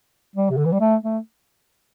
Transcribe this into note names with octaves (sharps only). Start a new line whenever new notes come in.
G3
C3
D3
E3
G3
A3
A3